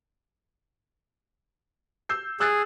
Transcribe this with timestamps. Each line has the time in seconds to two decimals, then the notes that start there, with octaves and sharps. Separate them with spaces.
2.09 E6 G6 C7
2.40 G#4 E6 F#6 A6